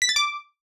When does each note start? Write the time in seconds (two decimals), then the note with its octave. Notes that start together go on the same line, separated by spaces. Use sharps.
0.02 B6
0.09 A6
0.16 D6